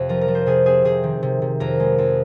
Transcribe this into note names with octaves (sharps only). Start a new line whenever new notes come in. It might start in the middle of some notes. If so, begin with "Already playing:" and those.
Already playing: F2 C3 C4 C5 F5
F3 A#4
A#4
F3
C5
C3 G#4
C4 G#4
C3 G#4
D#3
C3
C3
F2 A#4
G#3
F2